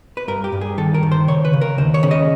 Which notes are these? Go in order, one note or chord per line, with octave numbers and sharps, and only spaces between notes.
B4
G2 A#4
G4
G2
G#4
D#3 A4
A#4
D#3
C5
C#3 C#5
B4
C#3
A#4
D#2 C5
C#5
C#3
D#5